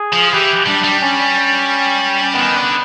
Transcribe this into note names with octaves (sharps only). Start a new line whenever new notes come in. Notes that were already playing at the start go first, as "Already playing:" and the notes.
Already playing: G#4
F3
E3 G4
G3 D4
G3
C#4
D#3 B3
D3